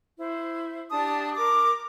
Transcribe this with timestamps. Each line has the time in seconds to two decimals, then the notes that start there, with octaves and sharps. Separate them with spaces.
0.17 E4 C5
0.90 D4 G4 A5 D#6
1.36 A#4 D6